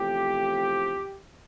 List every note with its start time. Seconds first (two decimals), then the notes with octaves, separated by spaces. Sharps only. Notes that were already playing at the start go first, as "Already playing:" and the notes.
Already playing: E2 C3 F3 A3 G4